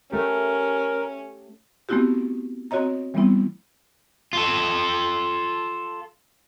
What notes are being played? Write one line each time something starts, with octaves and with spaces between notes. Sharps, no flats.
A3 C#4 G4 A#4
A3 B3 C4 E4 F#4 G4
C4 F#4 C#5 D#5 A#5
E3 G3 A3 B3 C4 E4
F4 A4